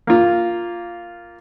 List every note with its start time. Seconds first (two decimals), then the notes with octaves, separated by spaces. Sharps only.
0.07 A#3 F4